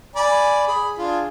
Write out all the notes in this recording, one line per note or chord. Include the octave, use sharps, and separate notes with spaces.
D5 G#5 B5
G#4 B5
D4 F4 G#4